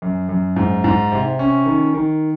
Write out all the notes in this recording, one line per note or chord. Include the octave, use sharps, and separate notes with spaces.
F#2
F#2
G#2
G#2
C3
C#4
D#3
D#3